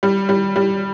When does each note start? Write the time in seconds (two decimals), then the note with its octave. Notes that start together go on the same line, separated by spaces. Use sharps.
0.03 G3
0.29 G3
0.56 G3